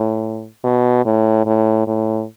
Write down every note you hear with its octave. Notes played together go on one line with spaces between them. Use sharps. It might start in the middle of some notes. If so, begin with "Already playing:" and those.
Already playing: A2
B2
A2
A2
A2